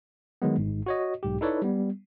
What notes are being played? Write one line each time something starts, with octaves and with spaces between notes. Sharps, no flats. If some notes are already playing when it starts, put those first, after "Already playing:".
D#3 F#3 G#3 B3
G#1 G#2
F#4 C#5 D#5
B1 G#2 G4
D#4 E4 A4 B4 C#5 D5
G3 B3